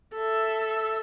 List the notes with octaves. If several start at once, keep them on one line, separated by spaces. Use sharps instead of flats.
A4 E5